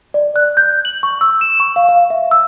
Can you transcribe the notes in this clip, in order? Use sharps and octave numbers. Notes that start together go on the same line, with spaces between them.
D5
F#6
G6
F#7
C#6
E6
E7
C#6
F5
F5
E5
E6